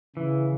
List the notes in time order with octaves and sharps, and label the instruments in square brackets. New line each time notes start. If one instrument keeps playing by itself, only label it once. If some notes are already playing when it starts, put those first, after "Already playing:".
[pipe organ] C#3 [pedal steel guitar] E3